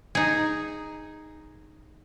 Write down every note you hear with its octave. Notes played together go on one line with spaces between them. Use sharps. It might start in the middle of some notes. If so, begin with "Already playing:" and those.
D#4 G#4